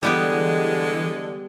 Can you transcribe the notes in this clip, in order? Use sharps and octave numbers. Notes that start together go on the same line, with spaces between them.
D3 E3 G3 G#3 B3 G4